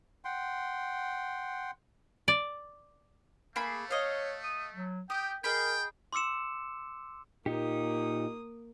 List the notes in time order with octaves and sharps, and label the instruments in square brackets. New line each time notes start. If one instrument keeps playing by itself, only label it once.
[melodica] F#5 G5 C6
[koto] D5
[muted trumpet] A3 [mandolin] A#3 G#4 B5
[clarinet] C#5 [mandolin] D#5 F5
[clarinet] D#6
F#3
[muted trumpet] G4 [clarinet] G5 [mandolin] D#6
[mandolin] G#4 D#5 B5 [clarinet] A#4 [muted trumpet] G5
[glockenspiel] C6 D6 E6 C#7 E7
[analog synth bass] A#2 [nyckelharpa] A#3 D#6 [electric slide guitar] D#4 G4